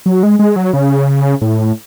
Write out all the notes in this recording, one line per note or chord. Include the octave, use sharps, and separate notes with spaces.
F#3
G#3
G#3
F#3
C#3
A2